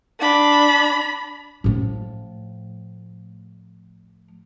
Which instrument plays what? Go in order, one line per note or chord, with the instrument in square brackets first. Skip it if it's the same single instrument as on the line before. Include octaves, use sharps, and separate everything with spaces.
[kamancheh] D4 B5
[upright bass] A2 F3